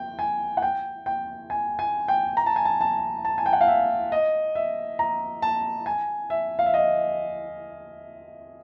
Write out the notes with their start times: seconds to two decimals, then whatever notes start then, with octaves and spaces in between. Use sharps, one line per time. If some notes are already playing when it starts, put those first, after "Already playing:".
Already playing: G5
0.19 G#5
0.57 F#5
0.62 G5
1.06 G5
1.50 G#5
1.79 G#5
2.08 G5
2.37 A#5
2.46 A5
2.56 G#5
2.65 A5
2.81 A5
3.25 A5
3.38 G#5
3.46 G5
3.53 F#5
3.61 F5
3.68 E5
4.12 D#5
4.55 E5
4.99 A#5
5.42 A5
5.86 G#5
6.30 E5
6.59 F5
6.66 E5
6.74 D#5